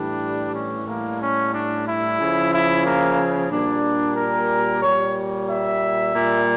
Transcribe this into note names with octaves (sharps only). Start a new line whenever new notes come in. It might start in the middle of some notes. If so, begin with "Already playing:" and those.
Already playing: A2 E3 G3 D4
C#4
A2 G3 A#3
C#4
D4
E4
C#3 F3
E4
A#3
A#2 G3 D4
A#4
A#2 G3 C#5
E5
A#2 G3